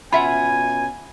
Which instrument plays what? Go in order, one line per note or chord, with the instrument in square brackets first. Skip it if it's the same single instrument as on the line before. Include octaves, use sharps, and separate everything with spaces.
[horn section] B2 C#4 G#5 [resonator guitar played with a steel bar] F4 E5 F#5 [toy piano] B5